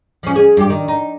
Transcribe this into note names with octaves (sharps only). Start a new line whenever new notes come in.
F3 C#4
C#4 G#4
G2 G4
D#3
D#4